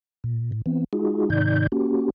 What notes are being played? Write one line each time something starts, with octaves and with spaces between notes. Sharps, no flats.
A#2
A2
E3 B3 C4
G#3 D#4 F4 F#4 G#4
G#2 C3 D#3 D#4 D5 G6
A#3 C#4 F#4 G4